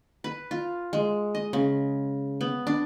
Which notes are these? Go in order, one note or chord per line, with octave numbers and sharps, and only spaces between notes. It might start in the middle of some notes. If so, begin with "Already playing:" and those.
B4
F4
G#3
D#5
C#3
B3
D4